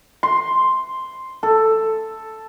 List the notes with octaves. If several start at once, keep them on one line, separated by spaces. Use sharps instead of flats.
C6
A4